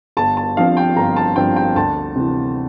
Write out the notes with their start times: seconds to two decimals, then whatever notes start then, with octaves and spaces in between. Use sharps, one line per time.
0.17 G1 A5
0.37 A5
0.57 G2 F3 C4 F5
0.77 G5
0.96 G1 A#5
1.16 A5
1.36 G2 F3 C4 G5
1.56 G5
1.76 D2 A5
2.16 C3 E3